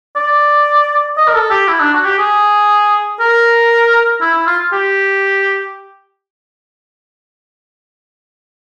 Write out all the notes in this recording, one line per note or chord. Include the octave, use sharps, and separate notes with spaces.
D5
D#5
A#4
A4
G4
E4
D4
F#4
G4
G#4
A#4
E4
E4
F4
G4